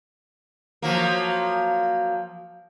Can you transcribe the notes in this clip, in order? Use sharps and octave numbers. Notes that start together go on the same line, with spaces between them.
F3 F#3 A#3